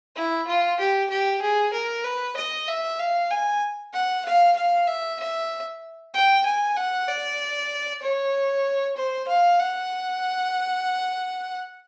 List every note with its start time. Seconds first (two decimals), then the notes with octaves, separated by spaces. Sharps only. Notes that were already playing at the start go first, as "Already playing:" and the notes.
0.16 E4
0.47 F4
0.79 G4
1.10 G4
1.42 G#4
1.73 A#4
2.04 B4
2.37 D#5
2.68 E5
2.99 F5
3.31 G#5
3.93 F#5
4.25 F5
4.56 F5
4.87 E5
5.19 E5
6.14 G5
6.45 G#5
6.77 F#5
7.08 D5
8.02 C#5
8.96 C5
9.28 F5
9.59 F#5